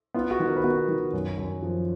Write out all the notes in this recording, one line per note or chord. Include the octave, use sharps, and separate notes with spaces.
B3 F4
F#4
D#3
A#4
B4
B3 F#4 A#4
D#3
F#2
F#2
F3